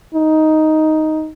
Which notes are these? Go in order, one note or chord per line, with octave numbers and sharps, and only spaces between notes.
D#4